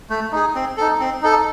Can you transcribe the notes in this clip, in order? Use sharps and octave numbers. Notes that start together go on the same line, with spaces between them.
A3
D#4 G#4
C4
D#4 A4
C4
D#4 A4